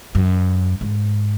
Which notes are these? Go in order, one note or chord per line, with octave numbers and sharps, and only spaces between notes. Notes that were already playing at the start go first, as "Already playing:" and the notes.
F#2
G#2